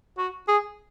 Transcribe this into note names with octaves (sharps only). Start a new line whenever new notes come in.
F#4
G#4